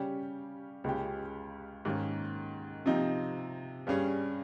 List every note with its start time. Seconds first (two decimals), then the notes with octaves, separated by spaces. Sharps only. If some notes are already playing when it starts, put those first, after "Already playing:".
Already playing: C#3 G3 C#4 G4
0.84 C#2 C#3 G#3 C#4 G4
1.85 G#2 D#3 A#3 C#4
2.86 C3 F3 C4 D#4
3.87 G2 G3 C#4 G#4